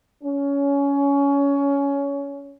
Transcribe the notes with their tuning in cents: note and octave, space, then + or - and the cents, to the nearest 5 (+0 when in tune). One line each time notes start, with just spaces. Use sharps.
C#4 +20